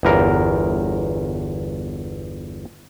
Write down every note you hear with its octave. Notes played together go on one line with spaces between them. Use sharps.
G1 E2 A#4